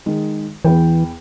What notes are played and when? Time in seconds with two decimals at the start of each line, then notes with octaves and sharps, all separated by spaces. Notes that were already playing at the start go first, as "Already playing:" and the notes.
0.06 D#3 G#3
0.65 E2 E3 B4 G5